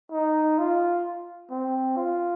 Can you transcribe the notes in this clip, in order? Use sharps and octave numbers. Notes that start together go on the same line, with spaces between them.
D#4
F4
C4
F4